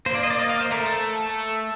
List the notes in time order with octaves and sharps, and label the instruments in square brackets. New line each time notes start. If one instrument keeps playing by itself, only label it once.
[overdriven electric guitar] A#3 [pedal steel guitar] C5
[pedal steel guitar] D5
D#5
D5
D#5
F5
C5
[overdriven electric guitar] A3 [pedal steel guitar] A#4
[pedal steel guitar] A4